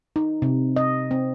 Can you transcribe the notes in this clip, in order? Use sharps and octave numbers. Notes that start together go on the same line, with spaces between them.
D#4
C3
D#5
C4